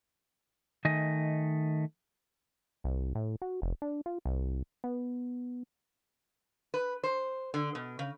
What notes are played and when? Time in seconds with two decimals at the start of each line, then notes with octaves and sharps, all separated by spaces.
0.85 D#3 A3 D#5 G#5
2.84 C2
3.15 A2
3.42 F#4
3.62 F1
3.82 D4
4.06 F4
4.25 C2
4.84 B3
6.74 B4
7.03 C5
7.54 D3
7.75 B2
7.99 C#3